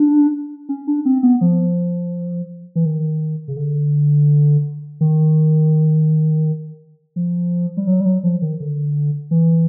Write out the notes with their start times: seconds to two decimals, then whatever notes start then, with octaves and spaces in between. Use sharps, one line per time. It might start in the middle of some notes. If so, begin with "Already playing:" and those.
Already playing: D4
0.69 C#4
0.87 D4
1.05 C4
1.23 B3
1.41 F3
2.76 E3
2.85 D#3
3.48 C#3
3.56 D3
5.01 D#3
7.16 F3
7.77 G3
7.87 F#3
8.00 G3
8.05 F#3
8.23 F3
8.42 D#3
8.60 D3
9.31 E3